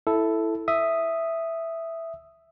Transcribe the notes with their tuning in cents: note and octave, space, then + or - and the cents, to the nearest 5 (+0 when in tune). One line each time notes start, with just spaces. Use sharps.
E4 +0 A4 +0
E5 +0 D#6 +0